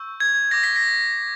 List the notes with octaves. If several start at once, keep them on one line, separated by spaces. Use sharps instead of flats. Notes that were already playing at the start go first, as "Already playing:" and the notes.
Already playing: C#6 E6 G6
G#6
D6 G6 A#6
B6
A#6